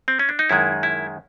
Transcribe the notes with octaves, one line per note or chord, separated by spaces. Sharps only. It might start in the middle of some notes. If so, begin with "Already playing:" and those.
C4
C#4
D4
D#4
F#2 D#3 G#3 E4
E4